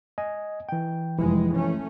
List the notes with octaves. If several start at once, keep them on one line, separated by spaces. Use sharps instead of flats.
D#5 G#5
E3 G5
F1 E3 F3 G#3 E4
A3 C#4